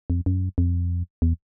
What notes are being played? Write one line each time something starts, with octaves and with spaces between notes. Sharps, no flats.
F2
F#2
F2
E2